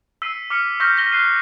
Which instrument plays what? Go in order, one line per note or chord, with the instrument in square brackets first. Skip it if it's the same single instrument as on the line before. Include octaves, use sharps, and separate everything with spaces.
[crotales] E6 B6 C7 D#7
D6 F6 B6 C#7
C#6 E6 F6 G6 A#6 B6
A#6 G7
F#6 C7 D#7